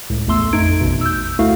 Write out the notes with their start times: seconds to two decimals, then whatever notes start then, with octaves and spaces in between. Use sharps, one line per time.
0.10 C#2 A2
0.27 A1 E2 A3 C6 E6
0.53 F2 A3 D#4 G#6 D7
0.81 A1 E2 B2
1.01 E6 G6
1.39 D2 A3 E4 F#4 F5